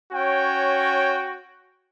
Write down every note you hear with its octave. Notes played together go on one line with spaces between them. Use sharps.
C#4 F#4 C#5 G5